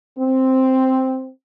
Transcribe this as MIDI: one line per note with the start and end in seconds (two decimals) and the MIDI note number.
0.18 1.29 60